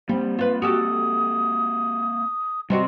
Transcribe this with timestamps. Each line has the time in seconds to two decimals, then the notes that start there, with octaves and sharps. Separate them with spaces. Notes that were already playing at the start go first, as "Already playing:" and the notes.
0.09 G3 A#3 C4 C5
0.39 F4 B4
0.62 F#4 G4 A4 D#6
2.70 C3 G3 C4 F#4 D#5